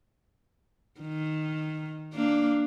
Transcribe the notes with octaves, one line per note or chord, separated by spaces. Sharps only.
D#3
A#3 D4